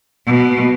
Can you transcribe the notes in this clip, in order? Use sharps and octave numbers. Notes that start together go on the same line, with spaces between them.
B2